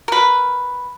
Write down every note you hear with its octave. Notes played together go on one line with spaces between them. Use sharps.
A#4 B4